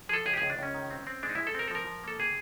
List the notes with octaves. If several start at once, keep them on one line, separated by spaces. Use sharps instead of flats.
F3 G#4 A4
C#2 G#4
G4
C#2 G#4
D4
C#2 C#4
D#3
C4
C4
G#3 D4
D#4
G#3 E4
A4
C4 A#4
A4
F3 A#4
F3
A#3 A4
C3 G#4